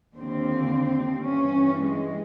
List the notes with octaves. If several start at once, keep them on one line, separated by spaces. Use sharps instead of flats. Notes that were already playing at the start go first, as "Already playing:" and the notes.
D#2 D3 F3 C4
G2 E3 C#4
G#3